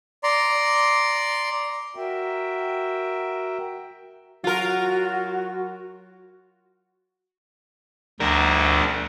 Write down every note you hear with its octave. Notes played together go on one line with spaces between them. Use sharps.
D5 A#5 C6
F#4 A#4 E5 G5
F#3 F4 F#4 A#4
D2 D4 A#4